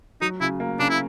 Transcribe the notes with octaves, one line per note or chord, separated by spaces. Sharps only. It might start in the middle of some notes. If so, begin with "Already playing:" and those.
F#3 D#4
C#3 E4
A#3
C#3 D4
E4